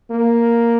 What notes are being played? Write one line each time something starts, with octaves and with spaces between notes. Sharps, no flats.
A#3